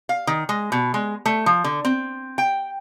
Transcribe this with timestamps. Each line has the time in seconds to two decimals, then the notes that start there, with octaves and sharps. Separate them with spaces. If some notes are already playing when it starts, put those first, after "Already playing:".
0.09 F5
0.27 D#3
0.49 G#3
0.72 B2
0.94 G#3
1.26 A3
1.46 F3
1.64 D3
1.85 C4
2.38 G5